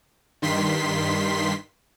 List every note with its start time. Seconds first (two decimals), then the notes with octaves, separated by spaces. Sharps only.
0.42 G2 D#3 C6 B6